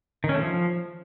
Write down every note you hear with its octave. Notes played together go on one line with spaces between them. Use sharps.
D#3
C#4
A3
F3